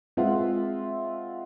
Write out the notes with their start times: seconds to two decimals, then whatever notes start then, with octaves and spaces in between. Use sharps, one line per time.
0.17 G#3 C4 F4 E5 F#5